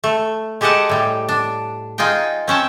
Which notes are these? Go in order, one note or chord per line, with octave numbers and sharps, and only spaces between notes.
A3
G#3 G4 A4 D#5 F#5 A5
A2 G3
D4
D#4 F4 G#4 D#5 G5
C4 C#4 G5 A5